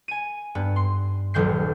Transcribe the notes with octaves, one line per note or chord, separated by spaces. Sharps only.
G#5 D#7
G2 B3
C6
D#1 A1 F#3 G6 C7